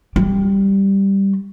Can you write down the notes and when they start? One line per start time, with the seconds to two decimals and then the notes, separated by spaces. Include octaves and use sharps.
0.16 G3